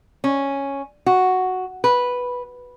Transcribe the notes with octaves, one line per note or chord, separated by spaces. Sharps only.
C#4
F#4
B4